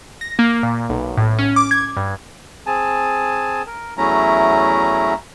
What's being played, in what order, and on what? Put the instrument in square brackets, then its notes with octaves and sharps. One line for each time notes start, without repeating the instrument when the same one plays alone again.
[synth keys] A#6
A#3
A#2
B1
A2
C#4
D6
G#6
G2
[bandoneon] C4 G#4 G#5 A5
A#4
E2 F#3 A3 C#4 E4 A#5